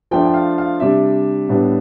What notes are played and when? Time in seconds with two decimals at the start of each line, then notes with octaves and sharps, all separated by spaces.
0.11 F3 A3 D4 G5
0.26 G5
0.34 F5
0.58 F5
0.80 C3 G3 D4 E5
1.49 A2 G3 B3 D4